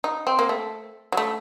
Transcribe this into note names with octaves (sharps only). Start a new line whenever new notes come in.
D#4
C4
A#3
A3
F#3
A3